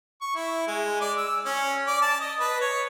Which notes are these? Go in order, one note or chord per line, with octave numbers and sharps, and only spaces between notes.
C#6
E4
G#3
D5
E6
C#4
D5
A5
D#5
B4
C#5